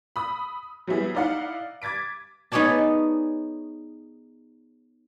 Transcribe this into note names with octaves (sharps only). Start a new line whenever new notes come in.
B5 D#6 E6
F#3 G3 B3 E4 G#4
D#4 E4 D5 F5 F#5
D6 G#6 A6 B6 D7
B3 D#4 G#4 C#5 D5 A5